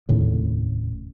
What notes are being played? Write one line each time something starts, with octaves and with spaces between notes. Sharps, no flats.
F1 D#2 A2 C#3